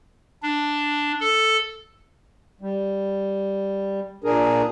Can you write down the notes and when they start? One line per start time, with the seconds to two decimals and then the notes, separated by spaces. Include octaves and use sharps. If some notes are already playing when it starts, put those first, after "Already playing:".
0.43 D4
1.20 A4
2.61 G3
4.24 A#2 D4 G#4 A#4